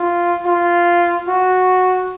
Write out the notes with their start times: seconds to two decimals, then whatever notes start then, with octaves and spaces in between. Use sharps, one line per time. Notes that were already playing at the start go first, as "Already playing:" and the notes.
Already playing: F4
0.46 F4
1.28 F#4